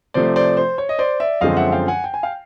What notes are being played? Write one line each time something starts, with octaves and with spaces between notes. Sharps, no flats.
C3 F3 A3 C5 D5
C5 D5
C5
C#5
D#5
C5 D5
D5 E5
F#2 D3 F3 G#3 C4 D#5 F5
E5 F#5
F5 G5
F#5 G#5
G5
G#5
F5 G5